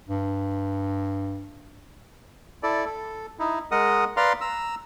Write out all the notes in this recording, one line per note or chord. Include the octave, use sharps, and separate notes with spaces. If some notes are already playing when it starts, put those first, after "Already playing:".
G2
E4 A4 D5
A4
D#4 E4
G#3 A#4 D#5 F#5 D#6
B4 D5 F5 A#5 C6
A#5 E6